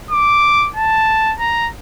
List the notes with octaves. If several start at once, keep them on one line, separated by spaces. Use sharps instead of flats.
D6
A5
A#5